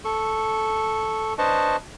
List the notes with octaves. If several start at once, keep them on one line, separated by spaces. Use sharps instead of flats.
A4 C#6
D4 B4 C5 D#5 A5 C#6